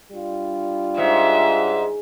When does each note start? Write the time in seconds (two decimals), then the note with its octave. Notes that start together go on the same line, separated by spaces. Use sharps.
0.12 G3 D4 F4
0.98 G#2 E5